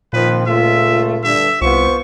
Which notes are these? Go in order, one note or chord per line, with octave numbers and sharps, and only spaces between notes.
A#2 D#3 F3 C4 B4
C#2 A3 F4 E5
G2 D3 E5
C2 B3 F4 C5 C#6